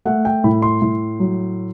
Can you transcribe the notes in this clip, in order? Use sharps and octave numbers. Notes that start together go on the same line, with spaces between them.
A3 F#5
G5
A2 B5
C6
A2
F#3